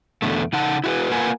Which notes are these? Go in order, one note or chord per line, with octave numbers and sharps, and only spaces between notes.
E2 B2 D3 A3
C#3 D#4 F#5 A5
E4 F#4 G#4 B4
A#3 F4 A#4 B4 F#5 G#5